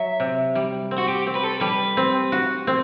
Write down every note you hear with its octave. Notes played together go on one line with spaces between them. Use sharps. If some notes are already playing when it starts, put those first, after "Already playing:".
Already playing: F#3 E5
C3
G3
C4
F#4
G4
C4
B4
A4
G3 B4
C4
F#4
C4